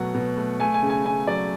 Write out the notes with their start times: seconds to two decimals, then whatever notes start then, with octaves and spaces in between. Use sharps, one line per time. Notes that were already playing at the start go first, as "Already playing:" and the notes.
Already playing: B2 F#3 A3 F#5
0.14 B2
0.37 A3
0.60 A3 G#5
0.74 G#5
0.83 C#3
0.90 G#5
1.05 C#3 G#5
1.27 F#3 D5